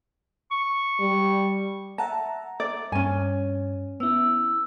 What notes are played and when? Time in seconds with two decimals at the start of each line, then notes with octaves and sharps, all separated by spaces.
0.51 C#6
1.00 G3
1.98 E5 F#5 A5 A#5
2.60 D5
2.92 G2 C#4 G#5
4.00 B3 E4 E6